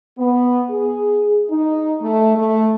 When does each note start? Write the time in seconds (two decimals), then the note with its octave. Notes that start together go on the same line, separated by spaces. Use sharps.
0.18 B3
0.70 G#4
1.49 D#4
2.01 A3
2.36 A3